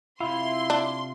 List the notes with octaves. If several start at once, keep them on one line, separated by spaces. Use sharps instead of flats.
C3 E4 F4 C6
D4